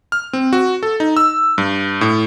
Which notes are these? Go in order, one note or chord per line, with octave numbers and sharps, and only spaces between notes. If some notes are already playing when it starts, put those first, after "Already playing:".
F6
C4
F#4
A4
D#4
E6
G2
A2